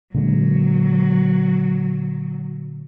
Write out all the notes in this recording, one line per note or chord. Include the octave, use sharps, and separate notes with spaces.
A#2 D3 F#3 G#3